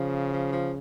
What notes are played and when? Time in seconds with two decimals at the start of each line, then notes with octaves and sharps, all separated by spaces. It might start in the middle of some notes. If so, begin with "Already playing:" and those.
Already playing: C#3 F3
0.33 F3
0.52 F3